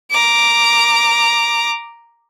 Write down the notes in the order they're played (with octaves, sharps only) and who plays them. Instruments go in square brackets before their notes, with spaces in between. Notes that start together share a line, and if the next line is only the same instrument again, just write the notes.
[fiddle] A#5 D6